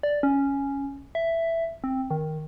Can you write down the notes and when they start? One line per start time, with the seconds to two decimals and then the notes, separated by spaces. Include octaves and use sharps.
0.03 D5
0.23 C#4
1.15 E5
1.84 C4
2.10 D#3